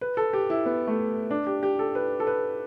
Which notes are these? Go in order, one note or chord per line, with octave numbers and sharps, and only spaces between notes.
B4
A4
G4
E4
B3
A3
D4
G4
G4
A4
B4
A4
B4